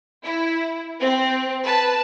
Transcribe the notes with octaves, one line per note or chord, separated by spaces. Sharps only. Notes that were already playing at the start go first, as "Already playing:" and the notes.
E4
C4
B4 A5